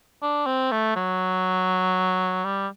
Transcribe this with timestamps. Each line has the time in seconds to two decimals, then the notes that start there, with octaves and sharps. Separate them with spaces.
0.22 D4
0.46 C4
0.71 A3
0.96 F#3
2.44 G3